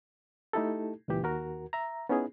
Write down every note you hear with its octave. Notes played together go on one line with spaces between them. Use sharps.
A3 D#4 E4 G4 A4
C#2 A#2 E3 G4
D#2 F#4 A#4
E5 A#5
B3 C#4 D#4 E4 G#4